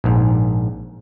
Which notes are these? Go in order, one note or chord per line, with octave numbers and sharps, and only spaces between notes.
A#1 G#2